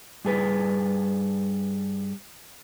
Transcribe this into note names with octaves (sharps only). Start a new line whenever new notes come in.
G2 G#4 B4